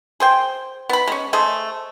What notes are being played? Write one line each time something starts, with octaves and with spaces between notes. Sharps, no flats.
G#4 C5 G5
B3 B5
G#3 C#4
A3 G#4 C5 D#5